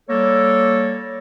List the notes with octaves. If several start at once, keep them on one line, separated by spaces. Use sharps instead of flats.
G3 A#3 A4 C#5